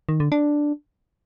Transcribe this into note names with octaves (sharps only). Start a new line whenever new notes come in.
D#3
D3
D4